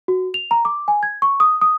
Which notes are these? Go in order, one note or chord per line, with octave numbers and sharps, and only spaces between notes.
F#4
F7
A#5
D6
G#5
G#6
C#6
D#6
D#6